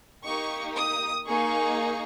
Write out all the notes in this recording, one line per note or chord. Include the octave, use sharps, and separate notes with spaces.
A#3 D#4 G4 C#6
D#6
A#3 D#4 G#4 C#6